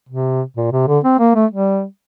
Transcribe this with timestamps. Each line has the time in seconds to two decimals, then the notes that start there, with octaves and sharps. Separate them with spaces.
0.09 C3
0.57 A#2
0.72 C3
0.88 D3
1.04 C4
1.19 A#3
1.35 A3
1.51 G3